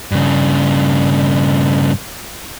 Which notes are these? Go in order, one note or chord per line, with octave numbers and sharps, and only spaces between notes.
G2 C#3